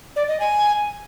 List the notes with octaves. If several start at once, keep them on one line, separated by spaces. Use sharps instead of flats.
D5
D#5
G#5